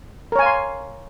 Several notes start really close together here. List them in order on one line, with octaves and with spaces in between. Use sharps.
A#4 C#5 G#5 F5 C6